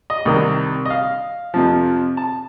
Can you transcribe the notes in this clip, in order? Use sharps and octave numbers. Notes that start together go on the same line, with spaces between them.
D#5
C2 C3 D#3
D#5
F5
F2 C3 F3
A5